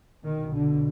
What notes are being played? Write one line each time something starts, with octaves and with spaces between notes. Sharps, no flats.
B1 B2 D#3
D3